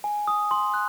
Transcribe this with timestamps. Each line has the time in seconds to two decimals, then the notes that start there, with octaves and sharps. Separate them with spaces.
0.04 G#5
0.28 D#6
0.51 C6
0.74 F#6